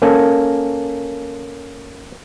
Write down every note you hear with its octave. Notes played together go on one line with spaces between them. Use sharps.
A#3 C#4 A4